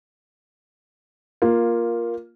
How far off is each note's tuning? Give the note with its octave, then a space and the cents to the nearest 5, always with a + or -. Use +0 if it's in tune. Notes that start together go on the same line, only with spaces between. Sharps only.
A#3 +10 F4 +0